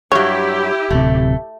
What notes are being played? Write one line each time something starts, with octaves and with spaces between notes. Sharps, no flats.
G2 F#3 E4 G4 C#5
D1 C3 A3